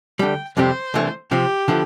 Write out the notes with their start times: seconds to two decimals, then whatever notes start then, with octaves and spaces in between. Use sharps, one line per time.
0.19 D2 D3 G3 G5
0.57 F2 C3 G3 C4 G4 C5
0.94 C2 C3 E3 A3 D4
1.31 C3 F3 C4 G4
1.68 D3 F3 B3 E4